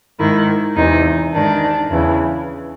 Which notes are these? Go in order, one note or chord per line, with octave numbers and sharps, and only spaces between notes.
G#2 D#3 E4
E2 C3 E3 D#4
G#2 D#3 D4
E2 C#3 E3